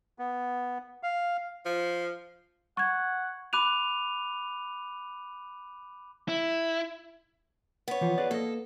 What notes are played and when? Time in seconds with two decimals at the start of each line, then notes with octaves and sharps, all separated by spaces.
0.19 B3
1.03 F5
1.65 F3
2.77 F#5 C#6 G#6
3.53 B5 D6 F#6 D#7 F7
6.28 E4
7.88 B3 C#5
8.01 E3 F3 F4
8.18 G#4 B4 D5
8.31 A#3 A4 D#5